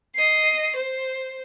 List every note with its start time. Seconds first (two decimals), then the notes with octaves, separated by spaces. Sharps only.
0.15 D#5 C7
0.76 C5